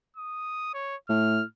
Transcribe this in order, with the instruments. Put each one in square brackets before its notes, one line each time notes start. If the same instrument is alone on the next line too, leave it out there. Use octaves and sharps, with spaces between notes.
[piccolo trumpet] D#6
C#5
[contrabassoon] A2 [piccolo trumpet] F6